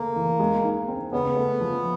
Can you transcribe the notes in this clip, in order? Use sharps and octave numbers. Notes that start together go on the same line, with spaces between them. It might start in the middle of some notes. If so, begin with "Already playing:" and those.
Already playing: C#3 A3 A#3
E3
G#3
D#4
C4
C#3 B3
A3
F3